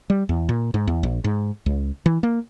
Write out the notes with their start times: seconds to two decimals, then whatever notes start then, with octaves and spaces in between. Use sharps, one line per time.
0.10 G3
0.29 E2
0.49 A#2
0.74 G#2
0.87 E2
1.03 A#1
1.24 G#2
1.66 C#2
2.06 E3
2.23 A#3